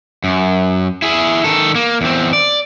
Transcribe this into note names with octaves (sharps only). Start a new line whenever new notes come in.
F#2
E4 G#4
D#3 A4
A#3
E2 C4
D5